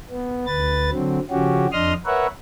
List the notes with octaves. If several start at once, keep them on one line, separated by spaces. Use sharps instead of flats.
B3
D2 B4 A6
D3 F#3 C4
C#3 F3 C#4 F#4 G4
F2 D4 D#5 C6 D#6 F6
A#4 B4 C#5 E5 F#5